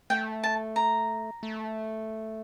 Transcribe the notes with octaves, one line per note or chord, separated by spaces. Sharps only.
A3 G5
A5
A#5
A3